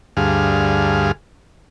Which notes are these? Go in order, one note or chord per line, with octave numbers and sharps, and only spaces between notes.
D2 G2 G#4 F5